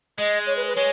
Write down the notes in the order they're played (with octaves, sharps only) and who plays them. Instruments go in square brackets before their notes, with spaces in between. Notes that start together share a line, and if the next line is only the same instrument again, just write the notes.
[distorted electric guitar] G#3 [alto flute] D#5
[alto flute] C#5
B4
B4
[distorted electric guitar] G#3 [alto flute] C#5